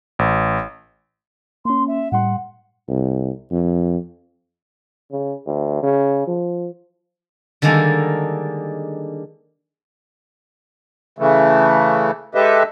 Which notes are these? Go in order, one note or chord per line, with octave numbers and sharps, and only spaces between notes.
A1
A#3 C#4 C6
E5
A2 G3 F#5 C6
C2
F2
C#3
D2
C#3
F3
D3 D#3 G3 G#3 A#3 A4
C#3 E3 A3
G#3 G4 A4 B4 D#5 E5